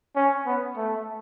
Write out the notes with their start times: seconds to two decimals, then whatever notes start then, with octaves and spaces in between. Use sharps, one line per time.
0.16 C#4
0.46 B3
0.77 A3